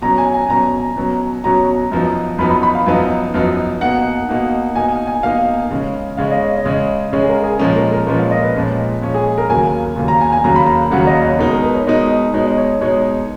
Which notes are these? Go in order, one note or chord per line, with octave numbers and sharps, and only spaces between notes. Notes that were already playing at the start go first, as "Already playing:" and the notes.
B2 F#3 C#4 A#5
G#5
G#5
B2 F#3 C#4 A#5
B2 F#3 C#4
B2 F#3 C#4 A#5
F#2 F3 B3 D#4
F#2 F3 B3 D#4 B5
B5
B5
F5
F#2 F3 B3 D#4
F#2 F3 B3 D#4
B2 A#3 D#4 F#5
B2 A#3 D#4
B2 A#3 D#4 G#5
G#5
B2 A#3 D#4 F5
C#3 G#3 C#4
C#3 G#3 C#4 F5
D#5
C#5
D#5
C#3 G#3 C#4
C#3 G#3 C#4 C#5
G#4
A#4
G#4
A#2 F3 G#3 C#4 A#4
A#4
A#4
A#2 F3 G#3 C#4 B4
F5
D#5
B4
A#2 F3 G#3 C#4
A#2 F3 G#3 C#4
G#4
A#4
D#2 C#3 F#3 A#3 G#5
D#2 C#3 F#3 A#3
A#5
G#5
G#5
D#2 C#3 F#3 A#3 A#5
B5
A#5
D#2 C#3 F#3 A#3 F#5
D#5
C#5
B2 G#3 D#4 A#4
A#4
B4
C#5
B2 G#3 D#4 D#5
B2 G#3 D#4 C#5
D#5
C#5
B2 G#3 D#4 C#5